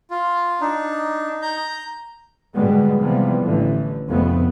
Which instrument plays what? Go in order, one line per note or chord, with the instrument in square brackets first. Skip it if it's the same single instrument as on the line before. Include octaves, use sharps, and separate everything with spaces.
[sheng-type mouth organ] F4
[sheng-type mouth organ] D4 [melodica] D#4
[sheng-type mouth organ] A#5 G6
[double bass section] G#2 B2 D3 G3 G#3 B3
C3 E3 F3 G3 B3
A1 D3 E3 A3
F1 F2 C#3 A3 B3